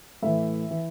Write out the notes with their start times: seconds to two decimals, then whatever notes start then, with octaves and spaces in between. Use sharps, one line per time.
0.22 A2 E3 E5
0.71 E3